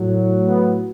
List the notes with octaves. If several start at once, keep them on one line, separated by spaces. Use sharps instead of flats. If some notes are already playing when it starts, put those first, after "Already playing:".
Already playing: A2 F#3
B3